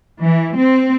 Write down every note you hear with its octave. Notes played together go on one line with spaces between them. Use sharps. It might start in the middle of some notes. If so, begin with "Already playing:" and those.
E3
C4